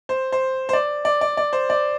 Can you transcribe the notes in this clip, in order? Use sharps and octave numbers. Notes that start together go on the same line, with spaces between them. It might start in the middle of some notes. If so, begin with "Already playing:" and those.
C5
C5
C5
D5
D5
D5
D5
C5
D5